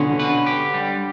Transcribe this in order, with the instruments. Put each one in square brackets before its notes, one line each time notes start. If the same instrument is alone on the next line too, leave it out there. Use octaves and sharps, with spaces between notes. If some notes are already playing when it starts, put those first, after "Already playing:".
Already playing: [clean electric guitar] B2 C#4 [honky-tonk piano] D3
[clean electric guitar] B4
G4
G3